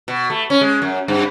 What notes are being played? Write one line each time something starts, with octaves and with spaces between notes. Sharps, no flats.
B2
A3
C#4
G#3
F#2
G2